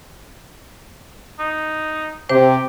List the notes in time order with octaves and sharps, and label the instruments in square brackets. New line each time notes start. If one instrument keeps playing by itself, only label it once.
[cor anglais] D#4
[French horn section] C3 [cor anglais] G4 [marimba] C5